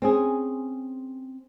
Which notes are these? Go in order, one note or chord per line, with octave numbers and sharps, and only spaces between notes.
C4 C#4 G#4